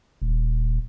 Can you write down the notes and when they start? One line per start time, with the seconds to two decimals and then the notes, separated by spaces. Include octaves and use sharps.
0.22 D#1